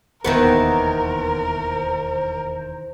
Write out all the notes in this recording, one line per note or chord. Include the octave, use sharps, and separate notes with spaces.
E1 D#2 D#3 E3 B3 A#4 C5